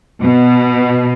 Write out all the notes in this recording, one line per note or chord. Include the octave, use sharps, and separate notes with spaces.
B2